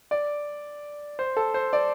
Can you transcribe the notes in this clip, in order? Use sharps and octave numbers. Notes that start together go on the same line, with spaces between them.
D5
C5
A4
C5
D5